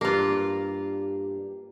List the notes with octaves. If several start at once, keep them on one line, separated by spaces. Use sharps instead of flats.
G2 A#3 D4 F4 G4